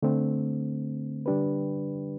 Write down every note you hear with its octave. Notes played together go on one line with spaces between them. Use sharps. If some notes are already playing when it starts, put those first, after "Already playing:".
D3 A3 C4
D3 G3 D4 G4 B4